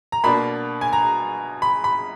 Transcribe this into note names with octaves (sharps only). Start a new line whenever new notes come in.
A#5
B2 A#3 D4 B5
G#5
A#5
B5
B5